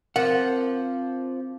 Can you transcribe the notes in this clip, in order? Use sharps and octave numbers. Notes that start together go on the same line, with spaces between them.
F3 C4 A#4 F#5 D6